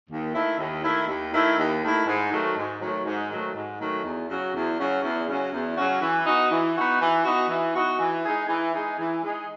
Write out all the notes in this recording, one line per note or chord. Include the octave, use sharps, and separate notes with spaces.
D#2
D#3 A3 E4
D#2
D#3 A3 E4
D#2
D#3 A3 E4
D#2
D#3 A3 E4
G#2
D#3 F#3 A3
G#2
D#3 F#3 A3
G#2
D#3 F#3 A3
G#2
D#3 F#3 A3
E2
C#3 F#3 C#4 F#4
E2
C#3 F#3 C#4 F#4
E2
C#3 F#3 C#4 F#4
E2
C#3 F#3 C#4 F#4
E3
B3 D#4 F#4
E3
B3 D#4 F#4
E3
B3 D#4 F#4
E3
B3 D#4 F#4
E3
G#3 D#4 G#4
E3
G#3 D#4 G#4
E3
G#3 D#4 G#4